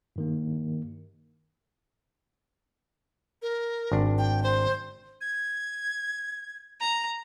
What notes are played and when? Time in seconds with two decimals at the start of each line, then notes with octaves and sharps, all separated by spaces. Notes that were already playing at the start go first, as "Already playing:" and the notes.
0.16 G2 D#3 A#3
3.42 A#4
3.91 G#1 D4
4.18 G5
4.43 C5
5.21 G#6
6.81 A#5